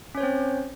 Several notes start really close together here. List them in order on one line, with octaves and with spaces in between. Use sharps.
C#4 C#5 C5 C4